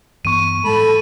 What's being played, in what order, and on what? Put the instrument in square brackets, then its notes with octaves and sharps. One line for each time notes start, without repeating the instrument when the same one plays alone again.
[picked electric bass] G2 E3 B3 [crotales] C#6 D#7
[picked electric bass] A2 G3 G#3 [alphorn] A4 [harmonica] A5 B5